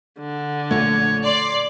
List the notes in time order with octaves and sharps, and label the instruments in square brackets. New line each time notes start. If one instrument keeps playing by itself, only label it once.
[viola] D3
[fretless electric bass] A#1 A#2 A3 [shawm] C#5
[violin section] D5 [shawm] C6